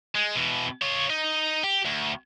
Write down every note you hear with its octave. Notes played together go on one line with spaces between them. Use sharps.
G#3
B2 E3
F4 C#5
D#4
G4
D2